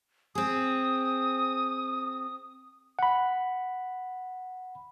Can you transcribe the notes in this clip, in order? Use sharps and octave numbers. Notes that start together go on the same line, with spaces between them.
C4 G#4 D#6
F#5 B5